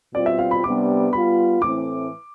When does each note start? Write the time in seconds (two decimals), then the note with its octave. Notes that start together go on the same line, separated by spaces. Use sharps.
0.14 B2 G3 C4 F4 D5
0.26 E5
0.39 F5
0.51 B5
0.64 C3 G3 B3 D4 D6
1.13 G3 B3 F4 B5
1.61 A2 E3 A3 C4 E4 D6